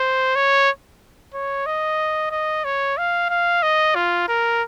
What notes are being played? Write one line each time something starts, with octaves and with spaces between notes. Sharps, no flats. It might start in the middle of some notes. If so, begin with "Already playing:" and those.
Already playing: C5
C#5
C#5
D#5
D#5
C#5
F5
F5
D#5
F4
A#4